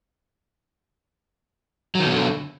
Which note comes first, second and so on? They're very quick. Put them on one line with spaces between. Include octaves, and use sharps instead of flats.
F#3 D#3 B2 D3